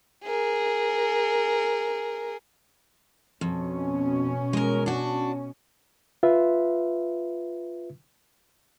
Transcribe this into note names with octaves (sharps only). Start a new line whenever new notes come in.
G#4 A#4
F2 B2 C#4
G#3 A#4
D4 F#4
F4 B4 E5